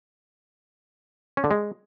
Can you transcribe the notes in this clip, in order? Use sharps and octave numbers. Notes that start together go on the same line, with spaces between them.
C#4
D3
G#3